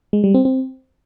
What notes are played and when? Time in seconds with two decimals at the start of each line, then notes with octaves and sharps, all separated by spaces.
0.13 G#3
0.24 G3
0.34 C4
0.45 C4